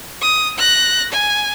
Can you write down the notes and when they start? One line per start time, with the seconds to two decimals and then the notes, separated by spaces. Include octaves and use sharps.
0.22 D#6
0.58 F#6 A#6
1.12 G#5